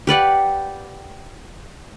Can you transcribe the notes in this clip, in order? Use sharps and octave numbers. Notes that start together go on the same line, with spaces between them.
G4 B4 D5 F#5